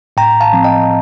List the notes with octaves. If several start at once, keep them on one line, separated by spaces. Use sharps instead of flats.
A2 G5 A#5
F5 A5
F3 C4
D#5 G5